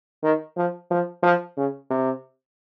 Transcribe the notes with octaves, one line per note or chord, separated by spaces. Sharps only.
D#3
F3
F3
F3
C#3
C3